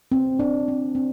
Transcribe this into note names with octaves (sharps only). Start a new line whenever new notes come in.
C4
D4
C4
C4